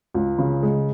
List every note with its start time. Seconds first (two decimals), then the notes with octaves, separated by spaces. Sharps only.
0.14 C#2
0.38 C#3
0.63 G#3